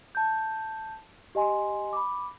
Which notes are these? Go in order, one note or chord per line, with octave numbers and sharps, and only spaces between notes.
A5 G6
G4 D#5 G#5 C6
B5 D6